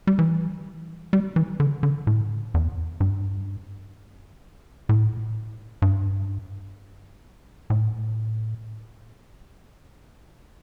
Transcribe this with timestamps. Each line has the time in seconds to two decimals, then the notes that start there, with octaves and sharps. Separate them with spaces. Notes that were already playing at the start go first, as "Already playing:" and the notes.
0.07 G3
0.19 E3
1.13 G3
1.36 E3
1.60 D3
1.83 D3
2.07 A2
2.54 E2
3.00 G2
4.89 A2
5.82 G2
7.70 A2